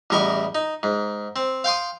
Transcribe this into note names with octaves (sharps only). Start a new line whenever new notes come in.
A1 E2 G3 A#4 D#5 C#6
D#4
G#2
C4
F5 G5 C6 D#6